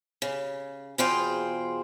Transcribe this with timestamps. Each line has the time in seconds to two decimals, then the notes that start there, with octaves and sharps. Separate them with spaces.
0.22 C#3
0.98 E2 B2 F4 G#4 C5 G5